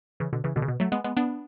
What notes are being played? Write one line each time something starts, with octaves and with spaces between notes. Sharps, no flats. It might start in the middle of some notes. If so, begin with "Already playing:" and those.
C#3 E3
B2 D3
C#3 E3
B2 D3
C#3
B2
F#3 A3
G#3 B3
G#3 B3
B3 D4